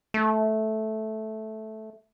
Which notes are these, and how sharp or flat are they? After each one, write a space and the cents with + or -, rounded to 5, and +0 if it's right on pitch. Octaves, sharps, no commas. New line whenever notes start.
A3 -10